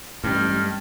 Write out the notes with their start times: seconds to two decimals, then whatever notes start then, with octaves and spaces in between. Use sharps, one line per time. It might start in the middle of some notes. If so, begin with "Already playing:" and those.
0.24 A1 G2 G#3 F6